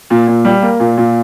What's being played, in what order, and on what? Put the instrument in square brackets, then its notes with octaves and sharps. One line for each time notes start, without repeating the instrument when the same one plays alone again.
[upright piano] A#2
A#2
G3
A#3
A#2
A#2